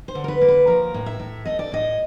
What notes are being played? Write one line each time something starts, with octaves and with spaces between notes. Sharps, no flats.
C5
D3
A#4
B4
A#3
B4
F3 A#4
A2
E5
A2
A3 D#5
D5
A2 D#5